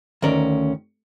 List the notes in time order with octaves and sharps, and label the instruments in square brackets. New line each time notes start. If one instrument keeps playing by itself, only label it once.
[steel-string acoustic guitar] D2 C#4 [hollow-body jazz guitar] D#3 A#4 D5